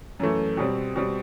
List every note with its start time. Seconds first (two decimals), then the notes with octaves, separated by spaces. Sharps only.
0.20 F#2 E3 A3
0.57 B2 G3 C4
0.96 B2 G3 C4